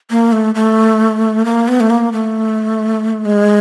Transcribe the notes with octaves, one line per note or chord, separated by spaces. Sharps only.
A#3
A3
A3
A#3
B3
A3
A#3
A3
G#3